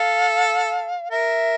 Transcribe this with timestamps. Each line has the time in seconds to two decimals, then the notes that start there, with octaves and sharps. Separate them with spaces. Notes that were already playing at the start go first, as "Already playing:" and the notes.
Already playing: A4 F5
1.11 A#4 E5